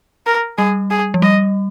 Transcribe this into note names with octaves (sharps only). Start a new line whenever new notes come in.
A#4
G3 G#4
G#4
F3
G3 D#5